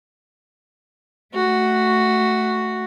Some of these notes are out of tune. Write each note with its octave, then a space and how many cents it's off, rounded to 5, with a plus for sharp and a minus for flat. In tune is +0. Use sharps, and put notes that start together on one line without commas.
A3 +0 F#4 +0